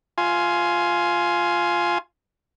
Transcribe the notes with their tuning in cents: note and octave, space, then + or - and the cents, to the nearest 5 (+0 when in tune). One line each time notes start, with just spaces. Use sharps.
F4 +0 G#5 +15